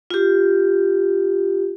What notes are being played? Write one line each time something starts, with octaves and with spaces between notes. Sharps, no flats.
F4 G4